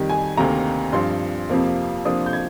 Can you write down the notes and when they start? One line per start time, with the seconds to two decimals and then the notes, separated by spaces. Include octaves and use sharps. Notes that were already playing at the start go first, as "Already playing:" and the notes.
Already playing: F2 D#3 G3
0.10 G#5
0.37 D2 C3 D#3 A#3 A#5
0.93 G2 F3 C4 C6
1.49 F2 C3 F3 A#3
2.05 C3 F3 A#3 D4 D#6
2.26 G6
2.33 G#6